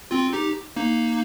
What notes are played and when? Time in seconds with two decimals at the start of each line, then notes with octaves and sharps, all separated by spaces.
0.11 C4 F4
0.33 D#4 G4
0.76 A#3 D#4